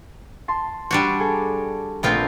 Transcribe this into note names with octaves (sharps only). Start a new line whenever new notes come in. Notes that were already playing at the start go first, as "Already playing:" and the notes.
A5 C6
G3 D4 F#4
G#4 A4
A#1 A3 B3 C4 F4 G6